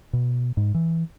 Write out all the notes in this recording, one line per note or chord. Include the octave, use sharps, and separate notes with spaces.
B2
G#2
E3